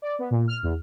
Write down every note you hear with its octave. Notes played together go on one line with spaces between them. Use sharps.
D5
B3
A#2
F6
E2